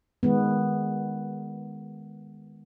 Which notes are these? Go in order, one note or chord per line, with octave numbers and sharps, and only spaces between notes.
D#3 G#3 B3